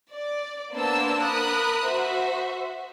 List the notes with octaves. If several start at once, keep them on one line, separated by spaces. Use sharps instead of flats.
D5
A#3 B3 D4 C5 A5 E6
A#4 B5 D#6 F#6
F#4 C5 E5